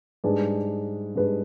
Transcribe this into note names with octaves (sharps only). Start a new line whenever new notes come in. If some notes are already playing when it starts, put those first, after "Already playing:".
G#2 G3 D4 G#4 B4
G#2 G3 D4 G#4 B4